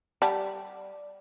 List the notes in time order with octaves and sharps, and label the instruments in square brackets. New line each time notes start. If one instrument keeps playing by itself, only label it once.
[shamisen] G3 [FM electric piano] D5 [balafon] F#5 A5